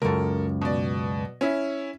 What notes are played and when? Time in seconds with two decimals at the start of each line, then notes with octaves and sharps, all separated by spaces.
0.02 C#2 F#2 A4 A#4
0.61 B2 D5
1.41 C#4 E4